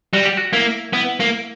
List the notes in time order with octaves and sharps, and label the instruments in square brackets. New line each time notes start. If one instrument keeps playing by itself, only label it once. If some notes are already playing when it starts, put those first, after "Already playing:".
[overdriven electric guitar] G3 [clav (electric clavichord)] F#4
[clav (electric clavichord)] G4
F#4
[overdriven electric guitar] A#3 [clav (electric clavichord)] E4
[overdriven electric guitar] B3 [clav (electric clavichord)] E4
[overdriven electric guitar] A#3